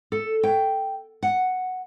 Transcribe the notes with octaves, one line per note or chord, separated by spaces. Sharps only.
A4
G5
F#5